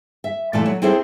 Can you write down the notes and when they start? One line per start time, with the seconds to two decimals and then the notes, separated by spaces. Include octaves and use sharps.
0.24 E5
0.53 A#2 E3 A3 F4 D5 A5
0.66 F#3
0.82 C4 E4 G#4 A4 C5